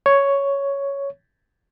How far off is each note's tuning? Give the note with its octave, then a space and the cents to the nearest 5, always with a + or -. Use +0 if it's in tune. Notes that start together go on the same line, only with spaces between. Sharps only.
C#5 +5